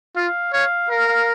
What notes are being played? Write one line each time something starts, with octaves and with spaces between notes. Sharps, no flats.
F4 F5
C#5 F5
A#4 F5
F5